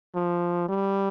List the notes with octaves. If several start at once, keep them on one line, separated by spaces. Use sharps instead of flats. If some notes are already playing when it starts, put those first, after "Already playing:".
F3
G3